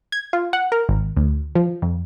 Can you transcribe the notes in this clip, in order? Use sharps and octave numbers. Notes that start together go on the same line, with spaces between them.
G#6
F4
F#5
A#4
G#1
D2
F3
F2